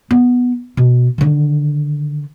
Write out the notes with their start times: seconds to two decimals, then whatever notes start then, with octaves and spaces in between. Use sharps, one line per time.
0.11 B3
0.77 B2
1.18 D3 D#3